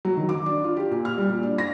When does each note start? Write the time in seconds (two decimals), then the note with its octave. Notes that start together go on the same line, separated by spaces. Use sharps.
0.05 F#3
0.17 D#3
0.29 D6
0.46 D4
0.64 F4
0.77 G4
0.91 A#2
1.05 F6
1.18 G3
1.29 A#2
1.43 D4
1.58 A#6